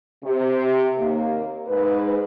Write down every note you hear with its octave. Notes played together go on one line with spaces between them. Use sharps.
C3
D#2 A#3
G#2 B4